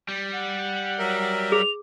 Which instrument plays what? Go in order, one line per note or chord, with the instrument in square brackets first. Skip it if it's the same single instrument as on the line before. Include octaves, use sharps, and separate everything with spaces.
[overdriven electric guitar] G3
[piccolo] F#5
[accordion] F#3 A#4 E5
[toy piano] G#4 [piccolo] F7